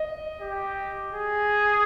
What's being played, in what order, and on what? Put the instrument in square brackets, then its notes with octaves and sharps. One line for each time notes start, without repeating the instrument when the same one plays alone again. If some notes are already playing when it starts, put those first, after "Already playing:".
Already playing: [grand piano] D#5
[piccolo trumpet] G4
G#4